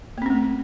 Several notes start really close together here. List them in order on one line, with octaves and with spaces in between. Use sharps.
A#3 C4 C#4 A3